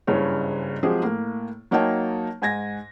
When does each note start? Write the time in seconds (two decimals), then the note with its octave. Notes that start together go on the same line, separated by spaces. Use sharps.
0.07 F#1 G2 C#3 E4 C#5
0.83 F3 F#3 G#3 C4 G4 G#4
1.02 A2 A#3
1.71 F#3 A#3 D#4 C#5 G5 A5
2.42 G#2 G#5 G#6 A#6